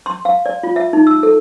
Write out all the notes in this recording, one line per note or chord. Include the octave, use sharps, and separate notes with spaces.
C6
F5
D5
F4
E5
D#4
E6
A4